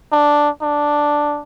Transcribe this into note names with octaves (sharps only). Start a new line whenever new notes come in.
D4
D4